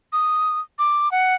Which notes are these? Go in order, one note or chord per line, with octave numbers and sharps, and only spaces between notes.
D#6
D6
F#5